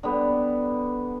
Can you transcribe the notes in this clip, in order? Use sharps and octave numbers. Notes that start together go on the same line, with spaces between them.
D3 G3 B3